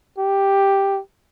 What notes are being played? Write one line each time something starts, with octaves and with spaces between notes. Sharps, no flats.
G4